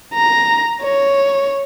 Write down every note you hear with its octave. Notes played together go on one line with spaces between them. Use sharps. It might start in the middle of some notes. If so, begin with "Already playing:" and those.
A#5
C#5